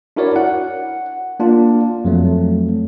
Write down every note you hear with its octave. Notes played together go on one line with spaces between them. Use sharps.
D4 E4 F#4 A#4 C#5 D5
F#5
A#3 D4 F4
F2 F#3 A3